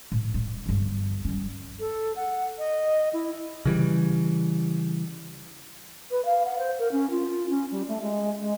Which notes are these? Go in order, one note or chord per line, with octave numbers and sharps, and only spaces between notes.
A2
G3
G1 G2
G3 C#4
A4
F#5
D#5
E4
C#3 E3 G3
B4
F5
F#5
C5
A#4
C#4
F4
C#4
G3
A3
G#3
G#3